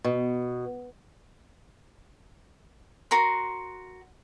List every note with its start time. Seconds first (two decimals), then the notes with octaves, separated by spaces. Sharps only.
0.05 B2
3.11 F#4 A#4 C6